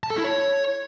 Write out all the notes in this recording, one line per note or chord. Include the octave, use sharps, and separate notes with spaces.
A5
A4
E4
C#5